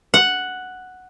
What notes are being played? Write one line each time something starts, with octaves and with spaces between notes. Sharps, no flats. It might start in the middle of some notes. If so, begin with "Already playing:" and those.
F#5